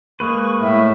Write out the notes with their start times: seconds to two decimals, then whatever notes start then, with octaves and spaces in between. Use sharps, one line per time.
0.20 G#3 A#3 B4 C#6
0.61 A2 E5